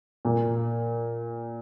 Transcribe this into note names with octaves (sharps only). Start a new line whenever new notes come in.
A#2